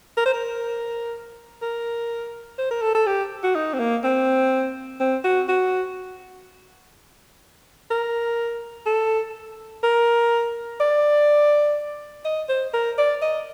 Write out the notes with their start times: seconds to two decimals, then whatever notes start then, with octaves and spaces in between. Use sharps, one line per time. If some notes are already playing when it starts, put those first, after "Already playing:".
0.17 A#4
0.26 C5
0.34 A#4
1.62 A#4
2.58 C5
2.71 A#4
2.82 A4
2.95 A4
3.07 G4
3.44 F#4
3.55 D#4
3.74 C4
3.79 A#3
4.04 C4
5.00 C4
5.24 F#4
5.49 F#4
7.91 A#4
8.86 A4
9.83 A#4
10.80 D5
12.25 D#5
12.49 C5
12.74 A#4
12.98 D5
13.22 D#5